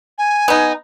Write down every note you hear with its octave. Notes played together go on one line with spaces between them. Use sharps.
G#5
B3 D#4